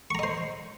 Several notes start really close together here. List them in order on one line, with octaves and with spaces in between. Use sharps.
C#6 A#5 D#5 C5